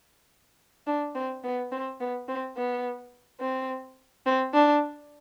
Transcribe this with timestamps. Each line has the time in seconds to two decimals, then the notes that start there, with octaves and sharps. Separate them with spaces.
0.87 D4
1.15 C4
1.44 B3
1.72 C4
2.00 B3
2.29 C4
2.57 B3
3.40 C4
4.26 C4
4.54 D4